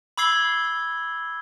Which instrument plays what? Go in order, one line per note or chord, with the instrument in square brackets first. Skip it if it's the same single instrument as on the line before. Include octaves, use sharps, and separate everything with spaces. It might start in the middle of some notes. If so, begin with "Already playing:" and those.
[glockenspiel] B5 D6 E6 G#6 C7 G7